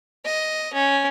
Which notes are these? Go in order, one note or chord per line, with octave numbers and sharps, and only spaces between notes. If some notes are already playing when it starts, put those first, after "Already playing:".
D#5
C#4